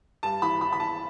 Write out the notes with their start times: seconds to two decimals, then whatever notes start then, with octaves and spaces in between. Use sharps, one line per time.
0.23 G2 A5
0.42 E3 B5
0.61 E3 B5
0.73 B5
0.80 E3 A5